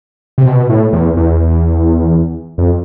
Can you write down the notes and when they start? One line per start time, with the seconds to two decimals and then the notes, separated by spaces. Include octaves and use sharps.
0.38 C3
0.45 B2
0.69 A2
0.93 E2
1.17 E2
2.58 F2